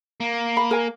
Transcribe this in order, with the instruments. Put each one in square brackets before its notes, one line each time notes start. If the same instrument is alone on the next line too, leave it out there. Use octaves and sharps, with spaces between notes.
[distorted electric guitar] A#3
[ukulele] B5
A#4 G#5